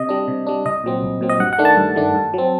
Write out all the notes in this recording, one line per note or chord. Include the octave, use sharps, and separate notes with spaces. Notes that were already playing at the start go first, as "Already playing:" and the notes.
Already playing: C3 D#5
G3 D4
C3
G3 D4
C2 D#5
A#2 F#3 C4
C2
A#2 F#3 C4
D#5
G2 F#5
F#5
D#3 A3 D4
A5
G2
D#3 A3 D4
G2
F#3 C4